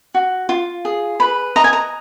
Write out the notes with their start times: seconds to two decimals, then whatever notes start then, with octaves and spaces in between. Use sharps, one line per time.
0.14 F#4
0.49 F4
0.85 G#4
1.20 B4 B5
1.56 D#5 A#5
1.64 G#5
1.73 A#5